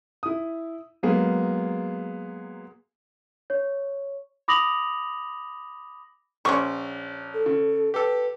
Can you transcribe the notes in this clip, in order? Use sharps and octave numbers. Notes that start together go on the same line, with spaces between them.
E4 D#6
F#3 G#3 A#3 B3 G#4
C#5
B5 D6 D#6 A#6 F7 F#7
A#1 C#4 C5 C#6 D6
A4
C#3
G4 A4 B4